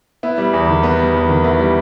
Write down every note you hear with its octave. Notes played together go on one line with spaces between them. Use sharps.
B3 E4
G3
E2
D#3
B3
G3
E2
D#3
B3 E4
G3